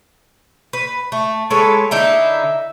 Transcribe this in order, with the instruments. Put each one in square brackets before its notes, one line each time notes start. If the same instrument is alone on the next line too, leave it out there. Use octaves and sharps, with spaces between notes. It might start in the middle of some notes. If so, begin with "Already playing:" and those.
[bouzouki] B4
A3
[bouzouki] G#3 B4 C#5 [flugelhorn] A4
[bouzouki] D3 D#4 E4 [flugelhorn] E5